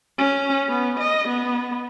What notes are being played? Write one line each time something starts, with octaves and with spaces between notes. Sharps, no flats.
C#4
B3
D#5
B3